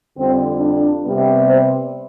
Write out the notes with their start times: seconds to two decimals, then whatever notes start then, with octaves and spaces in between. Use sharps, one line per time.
0.18 F2 D3 G3 C4
0.60 D4
1.03 C3 G3 B3
1.45 C5